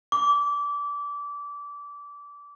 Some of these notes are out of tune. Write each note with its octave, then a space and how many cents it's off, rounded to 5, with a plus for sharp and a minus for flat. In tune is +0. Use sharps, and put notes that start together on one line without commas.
D6 -25